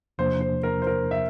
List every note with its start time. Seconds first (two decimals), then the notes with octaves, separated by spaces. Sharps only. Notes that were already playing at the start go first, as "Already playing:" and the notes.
0.18 E2 C3 F3 A#3 D4 C5
0.40 C5
0.63 A#4
0.82 C5
0.87 A#4
1.11 E5